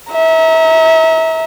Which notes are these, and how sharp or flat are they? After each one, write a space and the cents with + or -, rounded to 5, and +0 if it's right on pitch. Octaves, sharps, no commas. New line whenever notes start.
E5 -30 A#5 +0